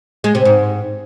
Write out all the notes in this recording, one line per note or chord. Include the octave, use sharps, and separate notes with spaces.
G#3
C3
G#2